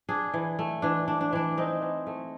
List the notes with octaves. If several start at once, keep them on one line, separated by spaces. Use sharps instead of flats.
D4 G#4
E3
A3
E3 D4
D4
D4
E3 D4
C4 D#4
E3
A3